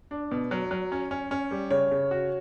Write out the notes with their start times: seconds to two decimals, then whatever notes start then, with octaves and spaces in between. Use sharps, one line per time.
0.11 D4
0.31 B2
0.51 F#3
0.71 F#3
0.92 C#4
1.11 C#4
1.31 C#4
1.51 G3
1.70 C#3 C#5
1.91 C#3
2.11 F#4